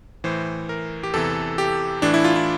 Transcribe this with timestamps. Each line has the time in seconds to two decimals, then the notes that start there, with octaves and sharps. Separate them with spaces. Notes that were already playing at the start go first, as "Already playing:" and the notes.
0.24 A2 E3 C5
0.69 A#4
1.03 G4
1.13 E2 C3 E3 A4
1.58 G4
2.02 A2 E3 D4
2.14 E4
2.24 F4
2.36 E4